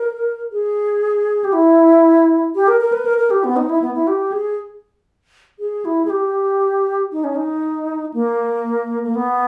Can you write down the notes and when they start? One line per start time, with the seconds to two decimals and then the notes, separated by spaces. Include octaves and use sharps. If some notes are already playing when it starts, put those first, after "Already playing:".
Already playing: A#4
0.52 G#4
1.44 G4
1.53 E4
2.55 G4
2.68 A#4
2.81 A#4
2.92 B4
3.06 A#4
3.18 A#4
3.30 G4
3.44 B3
3.56 D#4
3.69 E4
3.82 B3
3.94 E4
4.07 G4
4.32 G#4
5.59 G#4
5.85 E4
6.05 G#4
6.10 G4
7.12 D#4
7.24 C#4
7.36 D#4
8.14 A#3
9.03 A#3
9.15 B3